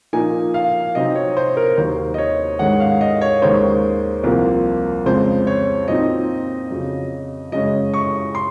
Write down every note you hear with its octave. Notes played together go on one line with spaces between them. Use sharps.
A#2 F3 A#3 D#4 G#5
F5
C3 F#3 C4 D#4 D#5
C#5
C5
A#4
D#2 D#3 F#3 C5
D#5
C#5
G#2 D#3 G#3 C#4 F#5
F5
D#5
C#5
D#2 D#3 G#3 C#4 C5
C2 A#2 F3 A#3
F2 C#3 G#3 C5
C#5
A#2 F#3 C4 D#4 D#5
F2 C#3 F#3
F#2 C#3 G#3 C#4 D#5
C#6
C6